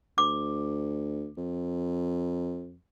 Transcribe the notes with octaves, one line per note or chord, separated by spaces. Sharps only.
D2 D6
F2